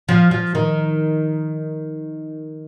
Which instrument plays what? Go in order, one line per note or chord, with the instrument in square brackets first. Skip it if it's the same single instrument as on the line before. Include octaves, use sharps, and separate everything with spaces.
[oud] F3
F3
D#3